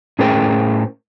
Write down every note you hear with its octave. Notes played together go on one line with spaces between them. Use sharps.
A2 C#4 G#4 A#4 C5 G5